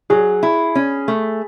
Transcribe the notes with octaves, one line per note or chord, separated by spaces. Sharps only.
F#3 G#4
E4
C#4
A3